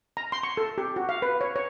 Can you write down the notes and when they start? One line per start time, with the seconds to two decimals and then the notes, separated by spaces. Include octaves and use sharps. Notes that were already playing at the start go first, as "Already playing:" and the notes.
0.17 A#5
0.32 C6
0.43 C#6
0.57 A4
0.78 G4
0.96 F#4
1.09 F5
1.22 B4
1.41 C#5
1.56 C#5